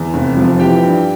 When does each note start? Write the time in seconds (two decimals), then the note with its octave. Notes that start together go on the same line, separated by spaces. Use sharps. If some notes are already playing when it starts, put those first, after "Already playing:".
Already playing: E2
0.14 F1
0.37 F3
0.60 E3 G4 G5
0.84 G2